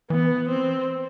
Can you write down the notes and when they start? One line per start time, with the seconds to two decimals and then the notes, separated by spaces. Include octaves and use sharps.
0.10 E3 B3
0.49 C4